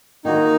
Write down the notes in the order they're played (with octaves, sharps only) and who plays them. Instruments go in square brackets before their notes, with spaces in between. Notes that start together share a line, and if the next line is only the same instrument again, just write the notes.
[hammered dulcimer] D#3 A#3 F#4 A#4 [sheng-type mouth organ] D#4